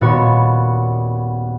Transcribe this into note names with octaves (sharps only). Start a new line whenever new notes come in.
D#1 A#2 B3 F#4 C#5 C#6